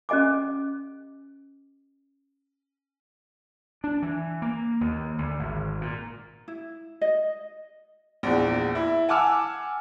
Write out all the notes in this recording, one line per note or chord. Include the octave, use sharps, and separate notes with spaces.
C#4 G4 D#5 G#5 D6
D4
E3
A#3
D#2
D2
G#1
A#2
E4
D#5
A#1 E2
E4
F#5 G#5 A5 D6 E6 F6